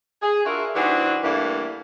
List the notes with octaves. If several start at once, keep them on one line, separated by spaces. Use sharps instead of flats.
G#4
D4 F4 F#4 A#4 E5
E3 G3 C4 D4 D#4 F#4
G2 E3 A3 A#3 D4 E4